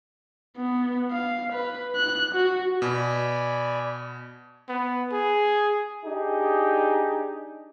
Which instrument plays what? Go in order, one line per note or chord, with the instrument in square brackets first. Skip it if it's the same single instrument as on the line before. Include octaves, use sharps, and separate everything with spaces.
[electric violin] B3
F5
B4
F#6
F#4
[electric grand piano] B2 [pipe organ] D5 G#5 B5
[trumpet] B3
G#4
[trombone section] D4 D#4 G4 G#4